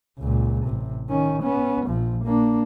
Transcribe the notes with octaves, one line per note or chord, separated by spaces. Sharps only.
C#2 A#2
A1 C3
D#3 C#4
B3 C#4
A#1 F3
A#3 D4